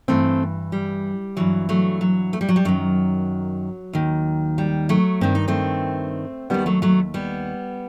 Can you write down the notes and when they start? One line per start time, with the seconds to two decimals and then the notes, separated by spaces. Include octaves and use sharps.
0.08 G2 E3 A3 C4
0.72 G3
1.37 G2 E3 F#3
1.69 F#3 A3
2.01 F#3
2.33 A3
2.41 G3
2.49 F#3
2.56 G3
2.65 F#2 D#3 F#3
3.93 D#2 D#3
4.58 G3
4.89 F#3 A3
5.21 G2 D#3 C4
5.35 D#4
5.48 A3 C4
6.50 D#2 D#3 G3 B3
6.66 F#3 A3
6.82 F#3 A3
7.14 G3 B3